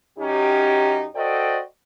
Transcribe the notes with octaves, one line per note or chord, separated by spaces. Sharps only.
F#2 C#4 D#4 G4
F#4 A4 C5 D5 D#5 G5